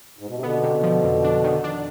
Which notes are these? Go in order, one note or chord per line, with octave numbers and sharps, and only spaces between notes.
G#2
B2
C3
B2 D3 B3
C3
F3
F2
D4
D#3
D4